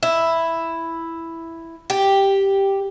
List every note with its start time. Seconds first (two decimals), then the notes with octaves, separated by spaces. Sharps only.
0.03 E4
1.90 G4